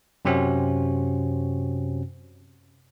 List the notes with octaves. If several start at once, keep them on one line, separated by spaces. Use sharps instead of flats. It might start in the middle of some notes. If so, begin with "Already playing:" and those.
F#2 C3 C4 C#4 F#4